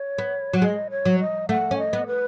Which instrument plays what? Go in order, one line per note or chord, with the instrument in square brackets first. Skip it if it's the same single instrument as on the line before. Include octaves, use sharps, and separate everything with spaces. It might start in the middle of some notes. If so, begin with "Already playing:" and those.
Already playing: [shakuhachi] C#5
[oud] B3
F#3
[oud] G#3 [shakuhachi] D#5
[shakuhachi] C#5
[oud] F#3
[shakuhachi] D#5
[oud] A3 [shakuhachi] F#5
[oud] C#4
[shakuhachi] D#5
[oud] B3
[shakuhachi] B4